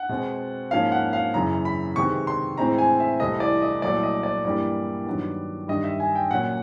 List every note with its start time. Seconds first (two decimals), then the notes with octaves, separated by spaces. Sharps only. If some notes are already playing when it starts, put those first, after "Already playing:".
Already playing: F#5
0.09 B2 G#3 C4
0.71 G#2 F3 A#3 C#4 F5
0.92 F#5
1.13 F5
1.34 F#2 C#3 E3 A#5
1.65 B5
1.96 C3 D#3 G#3 B3 C#6
2.27 C6
2.57 A2 E3 G#3 C4 A#5
2.78 G#5
3.00 E5
3.20 C2 C3 E3 A3 D#5
3.40 D5
3.62 D#5
3.82 C2 A#2 F#3 A3 D5
4.03 D#5
4.23 D5
4.44 G2 E3 G3 A#3 D5
5.06 G2 D#3 F#3 B3
5.68 G2 D#3 G3 D#5
5.84 E5
6.00 G#5
6.15 G5
6.31 A#2 F#3 A#3 C#4 F#5